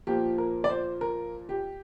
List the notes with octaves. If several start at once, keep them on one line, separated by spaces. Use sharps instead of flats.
A#2 F3 A#3 G4
A#4
D5
C5
A#4
G4